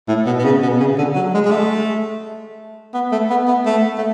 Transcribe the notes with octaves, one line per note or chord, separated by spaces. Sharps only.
A2
B2
B2
C#3
B2
C#3
D3
F#3
G#3
G#3
A3
B3
A3
B3
B3
A3
A3